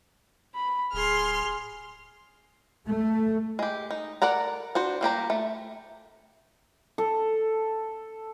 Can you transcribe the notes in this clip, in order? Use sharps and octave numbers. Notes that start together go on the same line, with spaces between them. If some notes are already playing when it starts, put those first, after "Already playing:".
B5
D1 G#4 C6 F6
A3
G#3 G4
D#4
A4 A#4 D5 F#5 A#5
D4 F#4 C5
G3 A#3 G4 A#5
A3
A4